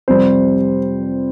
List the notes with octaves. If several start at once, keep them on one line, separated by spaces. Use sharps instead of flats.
F2 C3 G3 C5